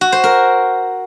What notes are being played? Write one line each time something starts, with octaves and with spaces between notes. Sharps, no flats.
F#4
C5
A#4